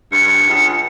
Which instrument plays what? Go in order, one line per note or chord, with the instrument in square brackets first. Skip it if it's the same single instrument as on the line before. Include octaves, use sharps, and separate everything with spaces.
[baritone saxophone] G2 [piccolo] C#7
[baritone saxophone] C#2